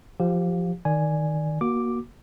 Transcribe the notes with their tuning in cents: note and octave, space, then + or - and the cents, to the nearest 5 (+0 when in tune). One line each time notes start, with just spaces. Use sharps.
F3 +0 G4 +0 F5 +20
D#3 +0 D5 +0 G#5 +0
A#3 +25 F#4 +0 D6 +0